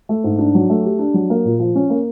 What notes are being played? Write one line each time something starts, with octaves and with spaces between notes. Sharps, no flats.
A3
G#2
D4
F#3
A3
G4
D4
F#3
A#3
A#2
F3
C#4
A#3